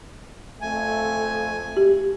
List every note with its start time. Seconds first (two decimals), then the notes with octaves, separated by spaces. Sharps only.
0.61 F2 A3 G#5
1.77 G4